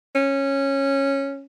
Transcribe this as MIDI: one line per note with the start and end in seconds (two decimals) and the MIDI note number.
0.15 1.46 61